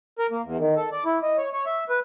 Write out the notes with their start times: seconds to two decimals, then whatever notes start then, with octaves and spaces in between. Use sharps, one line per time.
0.19 A#4
0.31 A#3
0.44 E2
0.58 D#3
0.76 A4
0.92 D5
1.05 E4
1.23 D#5
1.38 C#5
1.53 C#5
1.66 E5
1.90 B4